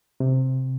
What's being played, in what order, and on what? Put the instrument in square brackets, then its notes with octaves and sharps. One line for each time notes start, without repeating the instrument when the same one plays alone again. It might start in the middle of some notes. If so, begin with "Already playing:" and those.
[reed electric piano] C3